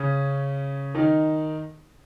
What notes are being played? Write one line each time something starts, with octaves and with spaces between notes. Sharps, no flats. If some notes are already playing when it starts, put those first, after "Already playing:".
Already playing: C#3 C#4
D#3 D#4